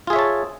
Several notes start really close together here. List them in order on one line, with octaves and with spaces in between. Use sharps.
F4 G#4 E5 C#5 A5